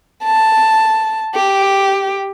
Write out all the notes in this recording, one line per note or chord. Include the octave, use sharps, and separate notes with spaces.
A5
G4